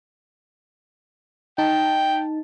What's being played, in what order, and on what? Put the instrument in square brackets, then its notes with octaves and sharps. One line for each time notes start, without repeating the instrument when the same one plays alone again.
[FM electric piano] D#4 A5 [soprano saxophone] G5